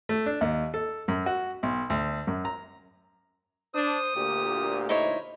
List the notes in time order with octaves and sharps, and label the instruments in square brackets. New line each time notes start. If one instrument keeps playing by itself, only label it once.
[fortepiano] A3
D4
D#2
A4
F#2
F#4
B1
D2
F#2
A#5
[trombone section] D4 [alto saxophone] C5 [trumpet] D#6
[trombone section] D2 A#2 [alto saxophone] G4
[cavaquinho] D#4 E4 C#5 [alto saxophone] C5